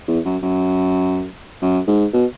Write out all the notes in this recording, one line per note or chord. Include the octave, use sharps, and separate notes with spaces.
E2
F#2
F#2
F#2
G#2
B2